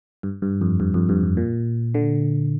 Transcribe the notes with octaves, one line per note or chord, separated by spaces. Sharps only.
G2
G2
F2
G2
F2
G2
G2
A#2
D3